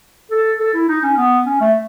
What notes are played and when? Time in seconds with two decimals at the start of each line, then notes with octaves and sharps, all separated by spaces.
0.31 A4
0.60 A4
0.74 E4
0.88 D#4
1.03 C#4
1.17 B3
1.46 C#4
1.61 A3